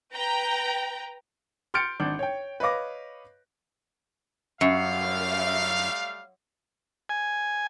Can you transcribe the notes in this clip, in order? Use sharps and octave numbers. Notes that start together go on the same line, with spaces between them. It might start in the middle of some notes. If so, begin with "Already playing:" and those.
B4 G5 A#5
C6 F6 G6 A6 C#7 D7
G#1 D4 G6
C#5 G5
B4 C#5 D#5 F5 D6 A#6
F#2 G3 A3 F5
G#5